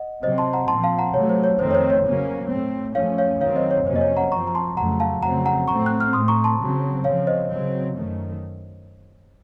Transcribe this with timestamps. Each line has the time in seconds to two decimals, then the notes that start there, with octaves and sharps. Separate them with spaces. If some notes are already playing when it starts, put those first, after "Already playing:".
Already playing: D#5 F#5
0.23 C3 F#3 C4 C5 D#5
0.38 A5 C6
0.53 F#5 A#5
0.68 A#2 F3 C4 A5 C6
0.84 F5 A5
0.98 F#5 A#5
1.14 C3 F#3 A3 C#5
1.29 C5
1.44 C#5
1.59 F2 D#3 A3 C4 C5
1.71 C#5
1.75 C5
1.90 C#5
2.05 C#3 F#3 A#3 C#4
2.50 A2 A3 C4
2.95 F#2 F3 A3 C#4 C#5 F5
3.18 C#5 F5
3.41 F#2 D#3 F#3 C4 C#5 F5
3.56 C5 D#5
3.71 C#5
3.86 F2 C3 F#3 A#3 C#4 C5
3.96 D#5
4.01 C#5
4.17 F#5 A#5
4.32 F#2 F3 C4 A#5 C#6
4.47 A#5
4.55 A5 C6
4.77 F2 C#3 F#3 A3 F#5 A#5
5.00 F5 A5
5.23 F2 C#3 F#3 A3 C4 F#5 A#5
5.46 F#5 A#5
5.68 A2 A3 C4 A#5 C#6
5.86 F#6
6.00 F6
6.13 A2 A3 C4 C6 D#6
6.28 A#5 C#6
6.44 A5 C6
6.59 C#3 F#3 C4
7.04 C#3 F3 C4 C#5 F5
7.27 C5 D#5
7.50 C#3 F#3 C4
7.96 F#2 D#3 A3